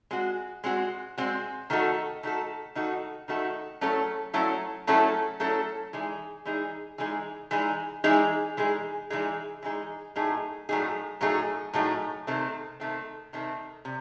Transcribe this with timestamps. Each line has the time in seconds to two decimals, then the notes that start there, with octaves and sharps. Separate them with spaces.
0.11 G#3 C4 F#4
0.64 G#3 C4 F#4
1.18 G#3 C4 F#4
1.70 D#3 A3 D#4 F#4 A4
2.23 D#3 A3 D#4 F#4 A4
2.75 D#3 A3 D#4 F#4 A4
3.28 D#3 A3 D#4 F#4 A4
3.81 F#3 A3 C#4 E4 A4
4.34 F#3 A3 C#4 E4 A4
4.87 F#3 A3 C#4 E4 A4
5.40 F#3 A3 C#4 E4 A4
5.93 E3 G#3 D#4 G#4
6.45 E3 G#3 D#4 G#4
6.98 E3 G#3 D#4 G#4
7.51 E3 G#3 D#4 G#4
8.04 E3 G#3 D#4 G#4
8.57 E3 G#3 D#4 G#4
9.10 E3 G#3 D#4 G#4
9.63 E3 G#3 D#4 G#4
10.16 A2 F#3 A3 D#4 G#4
10.69 A2 F#3 A3 D#4 G#4
11.21 A2 F#3 A3 D#4 G#4
11.73 A2 F#3 A3 D#4 G#4
12.27 C3 D#3 A3 C4
12.80 C3 D#3 A3 C4
13.33 C3 D#3 A3 C4
13.85 C3